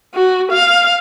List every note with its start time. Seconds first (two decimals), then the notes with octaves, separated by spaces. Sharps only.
0.14 F#4
0.52 F5